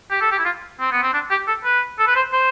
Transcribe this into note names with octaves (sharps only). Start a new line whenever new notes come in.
G4
A4
G4
E4
F4
C4
B3
C4
D4
G4
A4
B4
A4
B4
C5
C5